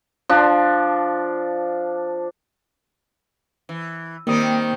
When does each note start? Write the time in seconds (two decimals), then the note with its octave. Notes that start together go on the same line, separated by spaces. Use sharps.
0.29 F3 D4
3.69 E3
4.27 D#3 G3 A#3 C4 D#6